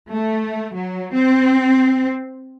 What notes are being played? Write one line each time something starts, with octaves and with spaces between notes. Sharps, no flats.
A3
F#3
C4